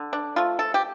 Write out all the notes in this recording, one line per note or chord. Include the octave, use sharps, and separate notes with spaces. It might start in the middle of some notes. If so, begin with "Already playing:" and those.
Already playing: D3
D4
F3 A3 F4
A4
G4